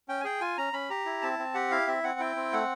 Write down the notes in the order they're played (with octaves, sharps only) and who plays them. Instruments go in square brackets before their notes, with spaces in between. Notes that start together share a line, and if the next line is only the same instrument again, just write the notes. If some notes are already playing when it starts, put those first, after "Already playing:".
[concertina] C#4 G5
G#5
G#4 G5
F4 G#5
C#4 A#5
C#4 B5
G4 A#5
E4
C4 A5
C4
G4 F#5
E4 F5
C4 E5
C4 F#5
E4 G5
C4
A3 F#5